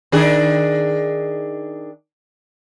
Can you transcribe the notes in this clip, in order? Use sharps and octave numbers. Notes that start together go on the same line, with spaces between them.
D#3 D4 G#4